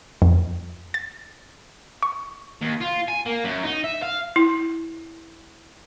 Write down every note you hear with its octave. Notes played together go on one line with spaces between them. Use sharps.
F2
A6
C#6
D#2
F4
G#5
A#3
F#2
D#4
E5
F5
E4